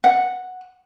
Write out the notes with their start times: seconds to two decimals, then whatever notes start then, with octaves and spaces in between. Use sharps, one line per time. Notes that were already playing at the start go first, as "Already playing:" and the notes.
0.04 F#5